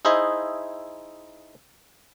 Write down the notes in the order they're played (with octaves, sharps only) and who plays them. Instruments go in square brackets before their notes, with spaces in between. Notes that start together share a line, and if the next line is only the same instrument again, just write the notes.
[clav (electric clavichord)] D#4 E4 G#4 C5 D#5 E5